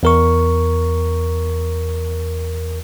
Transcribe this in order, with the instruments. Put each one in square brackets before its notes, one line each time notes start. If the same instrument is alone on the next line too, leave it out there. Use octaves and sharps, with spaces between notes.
[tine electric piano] E2 A#4 C#6